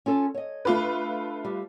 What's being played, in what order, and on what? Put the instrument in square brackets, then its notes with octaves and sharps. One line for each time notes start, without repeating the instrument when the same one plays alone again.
[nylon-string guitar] C#4 F4 A4
C#5 D#5
[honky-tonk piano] A3 F4 B4 [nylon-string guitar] D4
[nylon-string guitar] G3